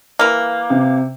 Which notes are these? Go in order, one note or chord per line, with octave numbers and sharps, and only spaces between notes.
E3 A#3
C3